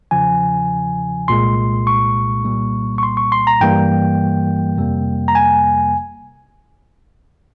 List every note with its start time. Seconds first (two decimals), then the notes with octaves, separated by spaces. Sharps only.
0.11 E2 C#3 F3 G#5
1.28 C2 A#2 G#3 C6
1.87 C#6
2.44 C2 A#2 G3 A#3
2.98 C#6
3.03 C6
3.17 C#6
3.32 C6
3.47 A#5
3.61 G2 E3 G3 A#3 G5
4.77 F2 C3 G3 A#3
5.28 A#5
5.35 G#5